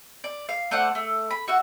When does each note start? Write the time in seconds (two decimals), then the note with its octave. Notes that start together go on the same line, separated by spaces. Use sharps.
0.24 D5
0.49 F5
0.71 A3 C5 D5 F#5
0.95 A3
1.31 B5
1.48 F#4 E5 F#5